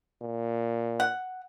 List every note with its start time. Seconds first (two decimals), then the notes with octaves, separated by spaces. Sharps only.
0.23 A#2
1.00 F#5